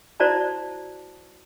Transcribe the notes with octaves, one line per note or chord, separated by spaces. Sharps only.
E4 F#4 C5 D5 A5 A#5